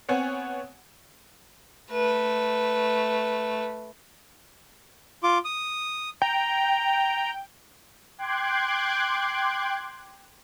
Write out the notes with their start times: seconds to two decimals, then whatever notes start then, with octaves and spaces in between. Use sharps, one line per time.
0.09 B3 C4 C#5 F#5 G#5
1.91 A3 B4
5.23 F4 D6
5.45 D#6
6.22 G5 A#5
8.18 G5 C6 D6 F#6 G#6